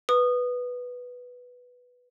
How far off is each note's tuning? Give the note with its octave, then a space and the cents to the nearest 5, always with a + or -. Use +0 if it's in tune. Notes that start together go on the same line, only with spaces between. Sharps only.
B4 +0 D#6 -20